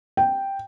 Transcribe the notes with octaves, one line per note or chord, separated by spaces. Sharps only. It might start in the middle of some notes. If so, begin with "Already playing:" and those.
G5